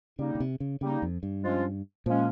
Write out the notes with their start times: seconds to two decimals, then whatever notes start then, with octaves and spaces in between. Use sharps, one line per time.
0.19 C#3 G3 A#3 D#4
0.35 C#3
0.40 C3
0.60 C#3
0.81 C#3 G3 A#3 D#4
1.02 F2
1.23 G2
1.43 F3 G#3 C#4 F4
2.06 A#2 F3 G#3 C#4 F4